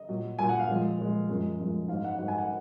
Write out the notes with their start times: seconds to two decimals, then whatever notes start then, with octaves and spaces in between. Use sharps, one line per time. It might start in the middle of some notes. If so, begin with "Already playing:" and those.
Already playing: D#5
0.09 A#2 F#3
0.39 A#2 F#3 G#5
0.49 F#5
0.59 F5
0.68 A#2 F3 G#3
0.98 A#2 F3 G#3
1.29 F#2 F3 G#3
1.59 F#2 F3 G#3
1.88 G#2 F#3 F5
2.04 F#5
2.18 G#2 F#3 F#5
2.28 G#5
2.38 F#5